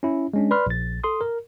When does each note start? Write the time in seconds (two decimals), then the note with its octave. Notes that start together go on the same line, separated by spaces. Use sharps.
0.03 C#4 E4
0.34 G#3 C#4 D4
0.51 B4 D5 B5 C6 F6
0.67 A#1 A6
1.04 A4 C6 D#6
1.21 A#4